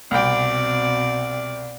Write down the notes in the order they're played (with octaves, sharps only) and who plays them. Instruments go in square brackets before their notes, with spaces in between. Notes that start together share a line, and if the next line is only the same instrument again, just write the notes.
[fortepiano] C2 G5 [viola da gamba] B2 C4 D5